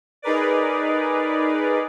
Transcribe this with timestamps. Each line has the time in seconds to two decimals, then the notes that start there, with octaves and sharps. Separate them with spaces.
0.22 D#4 G#4 A#4 B4 D5